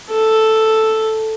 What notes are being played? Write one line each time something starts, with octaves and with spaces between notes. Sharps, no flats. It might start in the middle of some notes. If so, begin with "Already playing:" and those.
A4